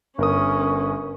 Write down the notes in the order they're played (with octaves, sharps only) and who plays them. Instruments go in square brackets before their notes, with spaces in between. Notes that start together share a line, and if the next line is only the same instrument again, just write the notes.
[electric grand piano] G1 A#4 D#6 [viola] C#4